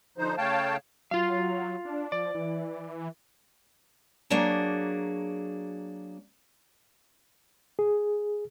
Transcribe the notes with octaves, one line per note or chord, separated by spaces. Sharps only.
D3 F3 D#4 C5
C#3 A3 C#5 F5 G5 A5
F#3 F4 F5
D4
F3 D5
E3
F#3 A#3 D4 F#4 G#4
G#4